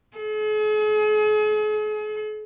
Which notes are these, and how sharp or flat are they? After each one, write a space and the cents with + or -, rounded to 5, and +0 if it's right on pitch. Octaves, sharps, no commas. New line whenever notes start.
G#4 +45